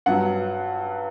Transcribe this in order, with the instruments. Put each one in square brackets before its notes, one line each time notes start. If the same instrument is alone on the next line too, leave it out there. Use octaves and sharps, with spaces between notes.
[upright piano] G2 F#3 F#5